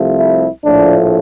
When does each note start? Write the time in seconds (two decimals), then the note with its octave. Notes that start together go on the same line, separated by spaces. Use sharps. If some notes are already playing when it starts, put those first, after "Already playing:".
Already playing: C2 C3 F3 A3
0.18 E4
0.64 A#1 A2 F3 A3 D4